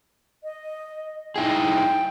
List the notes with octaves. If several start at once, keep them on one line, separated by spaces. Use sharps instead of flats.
D#5
D#4 E4 G#4 G5